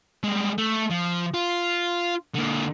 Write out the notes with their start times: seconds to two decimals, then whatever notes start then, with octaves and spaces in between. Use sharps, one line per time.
0.24 G3 G#3
0.58 A3
0.91 F3
1.34 F4
2.35 D3 A#3